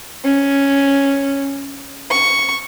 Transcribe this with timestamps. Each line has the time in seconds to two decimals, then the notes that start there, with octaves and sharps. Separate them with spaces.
0.24 C#4
2.11 C#6